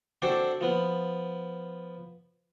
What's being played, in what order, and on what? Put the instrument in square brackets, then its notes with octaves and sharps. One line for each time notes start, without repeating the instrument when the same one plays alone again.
[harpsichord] C4 D4 F#4 A4 C5 D5
F3 B3